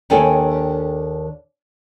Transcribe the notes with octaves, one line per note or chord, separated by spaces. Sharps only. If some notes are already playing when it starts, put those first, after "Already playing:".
D#2 D4 A4 C#5 G5 G#5